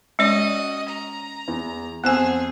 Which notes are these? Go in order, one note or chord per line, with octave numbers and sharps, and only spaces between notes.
G#3 C#4 F#4 D5 D#5
A#5
E2
F2 B3 G#4 C5 G#5 E6